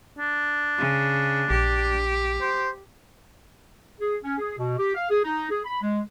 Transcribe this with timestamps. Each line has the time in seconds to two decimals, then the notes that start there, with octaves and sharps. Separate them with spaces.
0.19 D4
0.78 C#3
1.51 A#1 G4
2.41 C5
4.00 G#4
4.24 C#4
4.38 G#4
4.58 B2
4.77 G4
4.95 F5
5.10 G#4
5.24 D#4
5.50 G#4
5.65 B5
5.82 G#3